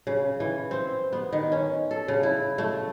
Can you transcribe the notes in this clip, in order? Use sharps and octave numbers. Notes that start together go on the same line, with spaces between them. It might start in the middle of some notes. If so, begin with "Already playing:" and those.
C#3
E3
C4
B3
D#3
C#4
A4
C#3
E4
A3